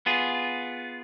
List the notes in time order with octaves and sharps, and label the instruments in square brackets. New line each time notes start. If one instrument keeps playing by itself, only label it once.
[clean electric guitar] B3 F4 G#4